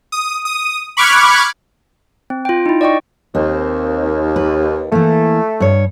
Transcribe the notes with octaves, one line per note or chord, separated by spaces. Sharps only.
D#6
D#6
B5 C#6 D6 F6 F#6 G#6
C4
F4 G5
D#4 E4
D5 D#5 G5 C#6
D#2 C4
B4
E3 A3 A#3
G2 C#5